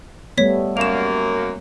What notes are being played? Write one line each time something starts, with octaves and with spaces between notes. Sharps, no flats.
G3 A3 B3 C#5 B6
F#2 A#3 C#5 E7 F7